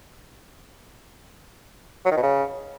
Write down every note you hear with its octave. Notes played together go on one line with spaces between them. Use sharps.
F#3
D#3
B2
C#3